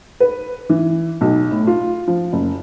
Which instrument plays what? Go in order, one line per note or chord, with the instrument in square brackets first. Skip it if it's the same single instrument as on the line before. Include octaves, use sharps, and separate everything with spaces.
[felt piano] B4
E3
B1
A2
F4
F3
F#1